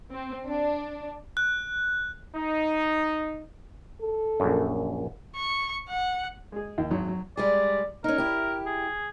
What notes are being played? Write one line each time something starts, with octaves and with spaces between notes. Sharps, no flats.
C4
D4
F#6
D#4
A4
A#1 F#2
C#6
F#5
G#3 G#4
D#2
G#1 F#3
F#3
G3 G#3 G#4 D5
C#4 D#4 A#4
E4 G4
G#4